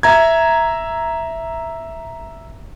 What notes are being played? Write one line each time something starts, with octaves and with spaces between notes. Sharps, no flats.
E5 A#5 G#6